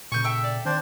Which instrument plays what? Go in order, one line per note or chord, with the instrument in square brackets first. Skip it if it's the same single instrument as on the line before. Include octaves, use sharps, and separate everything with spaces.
[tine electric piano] A#2 C#3 [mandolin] G#5 G6 [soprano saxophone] C#6
[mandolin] A4 E5 G5
[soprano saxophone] D5
[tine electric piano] D#3 [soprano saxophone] C4 [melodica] D4 C5